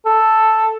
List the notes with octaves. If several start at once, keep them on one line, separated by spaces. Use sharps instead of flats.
A4